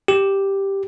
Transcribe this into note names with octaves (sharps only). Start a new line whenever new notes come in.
G4